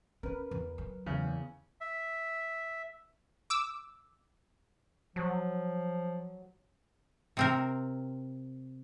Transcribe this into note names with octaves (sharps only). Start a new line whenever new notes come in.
C#4 A#4 B4
E2 E3
F#3
E2 C#3
E5
D6 E6
F3 F#3
C3 C4 A#4